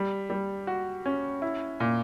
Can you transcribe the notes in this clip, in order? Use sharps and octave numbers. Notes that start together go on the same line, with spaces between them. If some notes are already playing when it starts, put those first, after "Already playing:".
Already playing: G3
G3
F#4
C#4
E4
A#2